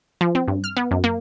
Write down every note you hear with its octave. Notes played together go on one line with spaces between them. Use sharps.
F3
C4
G2
F6
B3
F#2
A#3